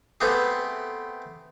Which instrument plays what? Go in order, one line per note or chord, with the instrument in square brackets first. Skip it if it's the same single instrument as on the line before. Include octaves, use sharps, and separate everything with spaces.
[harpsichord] A3 B3 C4 G4 G#4